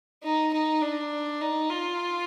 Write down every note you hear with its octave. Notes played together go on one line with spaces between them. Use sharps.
D#4
D#4
D4
D#4
F4